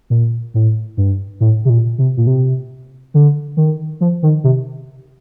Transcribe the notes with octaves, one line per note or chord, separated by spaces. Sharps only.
A#2
A2
G2
A2
C3
A#2
C3
A#2
C3
D3
D#3
F3
D#3
C3